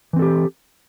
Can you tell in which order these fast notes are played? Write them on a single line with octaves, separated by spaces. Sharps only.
E3 C4 A4 G4